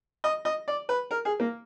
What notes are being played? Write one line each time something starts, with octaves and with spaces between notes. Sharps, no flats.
D#5
D#5
D5
B4
A#4
G#4
A#3